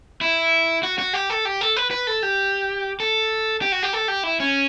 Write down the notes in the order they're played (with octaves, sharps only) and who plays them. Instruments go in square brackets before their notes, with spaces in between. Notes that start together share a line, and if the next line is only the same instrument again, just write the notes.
[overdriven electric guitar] E4
F#4
F#4
G4
A4
G4
A4
B4
B4
A4
G4
A4
G4
F#4
G4
A4
G4
E4
C#4